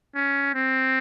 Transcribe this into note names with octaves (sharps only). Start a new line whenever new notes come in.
C#4
C4